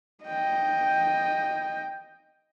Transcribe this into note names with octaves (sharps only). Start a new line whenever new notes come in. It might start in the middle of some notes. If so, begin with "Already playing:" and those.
D#5 G5